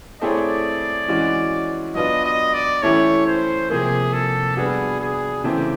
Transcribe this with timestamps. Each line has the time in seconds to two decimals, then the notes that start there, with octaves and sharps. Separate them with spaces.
0.22 A3 C4 E4 G#4 C#5 D5
1.08 E3 G#3 C#4 F#4
1.95 F#3 B3 D4 F4 D#5
2.25 D#5
2.54 D5
2.82 E3 A3 C#4 E4 G4 C#5
3.27 C5
3.70 C3 F3 A#3 G#4
4.13 A4
4.57 G3 B3 D4 F#4 G#4
5.00 G#4
5.44 C#3 E3 A3 C4 G4